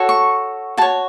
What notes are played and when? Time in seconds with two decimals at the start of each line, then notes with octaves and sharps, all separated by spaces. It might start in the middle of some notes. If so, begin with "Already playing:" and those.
Already playing: F#4 A4 C#5
0.09 C#6
0.77 F#4 A5
0.82 C#5